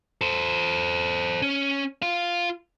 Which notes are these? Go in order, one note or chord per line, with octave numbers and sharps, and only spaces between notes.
A4 C5
C#4
F4 F5